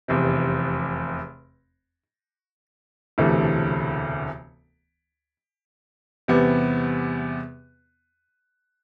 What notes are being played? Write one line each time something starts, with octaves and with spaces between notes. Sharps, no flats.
F1 E2 C3
E1 D2 C3 E3 A3
E2 C3 G3 B3